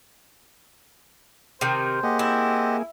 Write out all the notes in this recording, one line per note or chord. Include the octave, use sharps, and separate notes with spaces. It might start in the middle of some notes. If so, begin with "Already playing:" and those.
C3 D#3 C5
A#3 G4 G#4 D#5 F#5
C4 E4